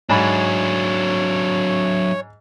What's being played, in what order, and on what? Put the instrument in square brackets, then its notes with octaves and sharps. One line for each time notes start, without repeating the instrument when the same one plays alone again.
[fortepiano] G#2 B5 [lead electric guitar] F#3 D4 [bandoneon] C#5